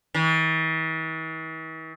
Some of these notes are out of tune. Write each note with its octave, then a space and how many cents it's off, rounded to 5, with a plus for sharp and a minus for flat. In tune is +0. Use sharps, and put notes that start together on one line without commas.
E3 -45